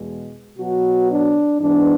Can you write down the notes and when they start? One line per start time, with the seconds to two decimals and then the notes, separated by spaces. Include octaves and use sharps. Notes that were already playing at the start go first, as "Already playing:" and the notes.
Already playing: E2 B2 G#3
0.58 B2 F#3 B3 F#4
1.10 D4
1.60 G#2 E3 B3 D4